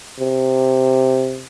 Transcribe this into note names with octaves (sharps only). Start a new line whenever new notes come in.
C3